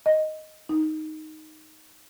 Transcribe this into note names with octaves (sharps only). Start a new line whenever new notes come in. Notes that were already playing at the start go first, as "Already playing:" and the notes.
D#5
D#4